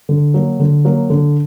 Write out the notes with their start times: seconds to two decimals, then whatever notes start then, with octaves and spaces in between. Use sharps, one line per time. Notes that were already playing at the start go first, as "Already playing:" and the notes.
0.09 D3
0.34 F#3 A#3
0.59 D3
0.85 F#3 A#3
1.10 D3